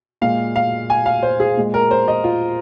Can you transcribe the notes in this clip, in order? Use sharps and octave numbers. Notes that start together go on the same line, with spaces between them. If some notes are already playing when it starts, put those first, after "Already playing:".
A#2 G#3 F5
F5
G#5
F5
C5
G#4
A#2 G#3
A#4
C5
D#5
F4